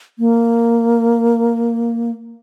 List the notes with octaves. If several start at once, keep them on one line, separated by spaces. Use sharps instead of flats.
A#3